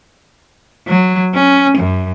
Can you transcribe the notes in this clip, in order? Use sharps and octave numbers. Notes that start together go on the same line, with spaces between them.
F#3
C#4
F#2